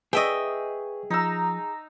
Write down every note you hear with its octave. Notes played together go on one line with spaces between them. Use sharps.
G#4 B4 D#5 E5 G5 C#6
F3 D#4 A#5 E6